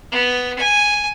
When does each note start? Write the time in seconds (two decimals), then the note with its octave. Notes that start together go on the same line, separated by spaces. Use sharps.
0.12 B3
0.59 G#5